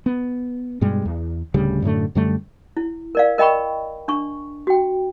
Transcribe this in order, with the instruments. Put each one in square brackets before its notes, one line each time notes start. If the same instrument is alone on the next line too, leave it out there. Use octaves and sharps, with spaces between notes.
[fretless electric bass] B3
G2 B2 G3 G#3
E2
D1 D2 C#3 G3
F#2 A2 D3 A3
F#2 D3 G3 A3
[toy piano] E4
A#4 D5 F5
A#4 D#5 G5 B5 C#6
D4 C#6
F#4 G5